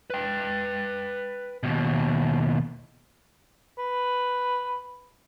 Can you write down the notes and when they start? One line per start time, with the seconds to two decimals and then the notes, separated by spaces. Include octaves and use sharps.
0.10 B4 G5
1.63 D#2 B2
3.78 B4